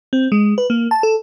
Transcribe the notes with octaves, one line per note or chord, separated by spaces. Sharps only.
C4
G#3
B4
A#3
A5
A4